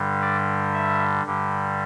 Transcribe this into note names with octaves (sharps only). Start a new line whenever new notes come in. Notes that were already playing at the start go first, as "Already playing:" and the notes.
Already playing: G2 D3 G3
D5
E5
G2 D3 G3